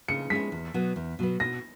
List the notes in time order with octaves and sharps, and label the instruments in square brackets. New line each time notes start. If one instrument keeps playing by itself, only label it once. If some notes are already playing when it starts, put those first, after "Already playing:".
[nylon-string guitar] C#3 [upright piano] C#7
[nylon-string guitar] G#3 C#4 E4 [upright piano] B6
[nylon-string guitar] E2
B2 F#3 B3
E2
B2 F#3 B3
[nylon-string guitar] B2 [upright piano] A#6